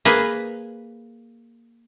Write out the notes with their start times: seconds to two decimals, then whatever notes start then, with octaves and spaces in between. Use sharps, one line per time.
0.05 A#3 G#4 B4